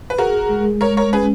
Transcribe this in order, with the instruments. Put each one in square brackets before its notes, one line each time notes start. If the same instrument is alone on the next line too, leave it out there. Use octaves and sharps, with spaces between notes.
[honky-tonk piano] B4
[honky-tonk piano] F#4 A#4 [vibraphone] G#4
[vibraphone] G#3
[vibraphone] G#3 [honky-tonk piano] A#4 C#5
[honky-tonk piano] A#4 C#5
[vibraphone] C#4 [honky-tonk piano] G#4 B4